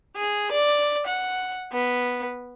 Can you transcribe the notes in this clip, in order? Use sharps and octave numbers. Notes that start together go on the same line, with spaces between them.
G#4
D5
F#5
B3